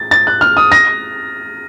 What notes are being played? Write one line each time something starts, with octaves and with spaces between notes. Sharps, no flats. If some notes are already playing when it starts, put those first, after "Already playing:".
Already playing: A6
A6
F#6
F6
D#6
A#6